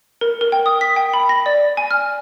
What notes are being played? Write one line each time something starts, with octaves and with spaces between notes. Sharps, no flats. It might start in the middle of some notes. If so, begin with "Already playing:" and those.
A#4
A#4
G5
D#6
B6
G5
B5
A#6
D5
G#5
F6